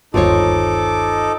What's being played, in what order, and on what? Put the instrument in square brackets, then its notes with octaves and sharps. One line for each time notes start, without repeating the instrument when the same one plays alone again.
[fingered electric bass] G1 D#2 [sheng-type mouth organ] D#4 A4 D6 [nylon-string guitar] F4 C5 C#5